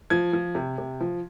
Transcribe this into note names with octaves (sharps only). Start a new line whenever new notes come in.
F3 G#6
F3
C3
C3
F3